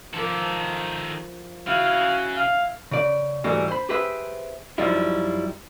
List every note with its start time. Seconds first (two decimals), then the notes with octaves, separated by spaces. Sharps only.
0.14 D#3 F3 A#3 A4
1.67 C#3 E4 F#4 F5
2.37 F5
2.91 C#3 D5
3.44 G#2 E3 G3 A3 A#3 F#4
3.68 C5 B5
3.89 G4 G#4 B4 C5 E5
4.78 F#2 F3 G3 D#4 E4